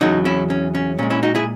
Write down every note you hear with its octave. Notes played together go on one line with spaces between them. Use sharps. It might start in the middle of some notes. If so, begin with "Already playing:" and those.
E2 C#3 F#3 D#4 F#4
C#4 E4
C#4
C#4
A#2 G#3 C#4
C#4 E4
D#4 F#4
E4 G#4